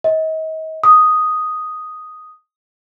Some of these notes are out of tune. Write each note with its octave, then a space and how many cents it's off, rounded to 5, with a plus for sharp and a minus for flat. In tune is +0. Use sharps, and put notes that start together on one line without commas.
D#5 +35
D#6 +0